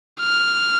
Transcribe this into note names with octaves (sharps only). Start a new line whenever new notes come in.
F6